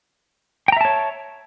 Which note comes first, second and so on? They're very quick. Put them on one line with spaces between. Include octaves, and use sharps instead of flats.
G5 A#5 E5 A5 C#5